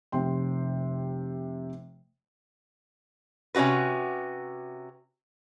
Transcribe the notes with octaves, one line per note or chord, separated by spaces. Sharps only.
F1 C3 G5 C6
C3 C#4 E4 F#4 B4